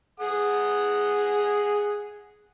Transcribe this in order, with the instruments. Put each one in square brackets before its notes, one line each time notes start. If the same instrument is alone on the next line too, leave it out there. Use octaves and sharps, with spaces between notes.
[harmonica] G#4 F#5 D#6